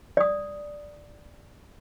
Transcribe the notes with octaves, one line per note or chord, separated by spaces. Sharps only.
D5 D#6